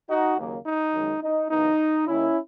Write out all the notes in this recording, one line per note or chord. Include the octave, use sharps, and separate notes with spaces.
D#4 F#4
D#2 C#3 F#3 A#3
D#4
F#2 D#3 G#3
D#4
F#2 C#3 E3 B3 D#4
D#2 D#3 A#3 C#4 E4